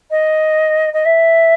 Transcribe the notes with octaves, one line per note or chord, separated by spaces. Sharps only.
D#5
D#5
E5